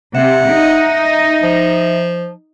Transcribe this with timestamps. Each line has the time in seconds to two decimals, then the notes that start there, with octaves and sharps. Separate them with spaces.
0.15 C3 E5 F#5
0.50 D#4
1.43 F3